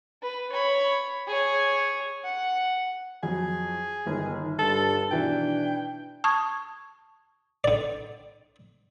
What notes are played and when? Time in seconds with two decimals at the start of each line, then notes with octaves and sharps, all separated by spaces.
0.22 B4
0.53 C#5 B5
1.28 G#4 C#5
2.24 F#5
3.23 F2 F#3 G#4
4.07 G1 D#3
4.59 G2 A4
5.11 B2 D#3 E3 D4 G5
6.24 A5 C#6 D#6 G#6
7.64 D3 D5